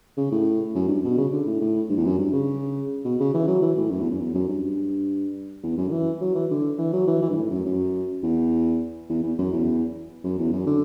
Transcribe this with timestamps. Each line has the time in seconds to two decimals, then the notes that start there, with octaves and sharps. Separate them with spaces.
0.17 C#3
0.31 A2
0.75 F#2
0.88 G2
1.04 B2
1.17 C#3
1.32 D3
1.47 A2
1.61 A2
1.90 G2
1.98 E2
2.05 F#2
2.18 G2
2.32 C#3
3.04 B2
3.20 C#3
3.34 E3
3.47 F#3
3.62 E3
3.77 A2
3.91 F#2
4.00 E2
4.10 F#2
4.19 E2
4.34 F#2
4.48 G2
5.63 E2
5.77 F#2
5.88 D3
5.92 E3
6.21 F#3
6.35 E3
6.51 D3
6.78 E3
6.93 F#3
7.07 E3
7.22 E3
7.29 G2
7.37 A2
7.51 F#2
7.65 F#2
8.23 E2
9.09 E2
9.23 E2
9.38 F#2
9.53 E2
10.23 F#2
10.39 E2
10.53 F#2
10.67 D3